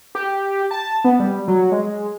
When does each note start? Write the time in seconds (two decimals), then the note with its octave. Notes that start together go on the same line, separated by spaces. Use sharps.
0.15 G4
0.71 A5
1.04 B3
1.20 G3
1.48 F#3
1.72 G#3